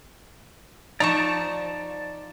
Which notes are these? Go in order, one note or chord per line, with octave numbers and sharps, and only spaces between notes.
F3 D#4 D5 A5 A#5 C6 C#6